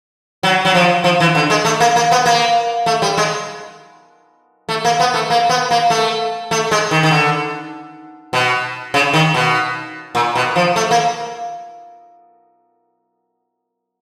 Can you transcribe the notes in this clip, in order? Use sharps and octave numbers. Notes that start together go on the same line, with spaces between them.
F#3
F#3
F3
F3
E3
D3
G#3
A3
A#3
A#3
B3
A#3
A3
G3
G#3
A3
A#3
B3
A3
A#3
B3
A#3
A3
A3
G#3
D#3
D#3
D3
B2
C#3
D#3
B2
A#2
B2
F3
A3
A#3